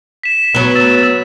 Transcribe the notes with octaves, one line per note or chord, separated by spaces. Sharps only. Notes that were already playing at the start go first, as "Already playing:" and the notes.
B6 E7
F#3 B3
E6 A6 E7
E6